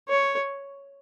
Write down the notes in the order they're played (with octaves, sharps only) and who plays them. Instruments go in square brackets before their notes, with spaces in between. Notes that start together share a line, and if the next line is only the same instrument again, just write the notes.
[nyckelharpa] C#5